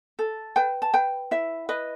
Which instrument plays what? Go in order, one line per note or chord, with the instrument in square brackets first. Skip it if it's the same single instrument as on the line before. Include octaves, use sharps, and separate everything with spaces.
[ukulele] A4
B4 G5
A5
B4 G5
E4 E5
B4 D#5